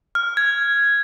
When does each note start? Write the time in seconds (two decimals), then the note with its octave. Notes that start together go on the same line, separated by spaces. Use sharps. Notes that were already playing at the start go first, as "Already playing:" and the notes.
0.15 F6
0.37 G#6